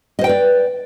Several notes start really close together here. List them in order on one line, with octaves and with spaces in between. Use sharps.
D#5 C5 G5 B4 D5